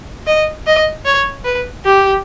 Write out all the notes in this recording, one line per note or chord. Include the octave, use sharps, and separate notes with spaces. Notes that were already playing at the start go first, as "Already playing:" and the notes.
D#5
D#5
C#5
B4
G4